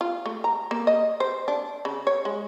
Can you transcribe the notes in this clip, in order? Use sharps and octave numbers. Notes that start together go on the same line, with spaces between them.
F4
A3
A#5
A#3
D#5
C5
D4
C#3
C#5
G#3